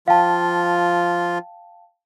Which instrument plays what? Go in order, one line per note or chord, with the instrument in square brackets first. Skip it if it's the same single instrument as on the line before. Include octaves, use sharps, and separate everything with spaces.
[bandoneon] F3 F4 [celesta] F5 G5 A5